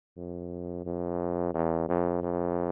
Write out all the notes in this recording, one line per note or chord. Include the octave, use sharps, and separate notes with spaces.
F2
F2
E2
F2
F2